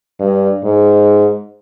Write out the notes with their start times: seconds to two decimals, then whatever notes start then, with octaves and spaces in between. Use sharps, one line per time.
0.20 G2
0.64 G#2